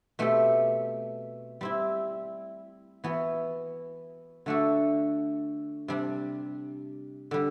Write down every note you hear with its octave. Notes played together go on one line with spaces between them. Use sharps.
B2 A3 C4 G4
G3 C4 E4
E3 B3 F#4
D3 A3 D4 F#4 A4
C3 G3 D4
D3 G3